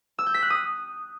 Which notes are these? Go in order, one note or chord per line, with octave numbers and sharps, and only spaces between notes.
E6
G6
B6
F#6
D#6